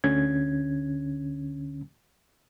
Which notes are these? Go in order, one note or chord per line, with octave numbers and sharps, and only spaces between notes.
D2 D3 C#4 G#6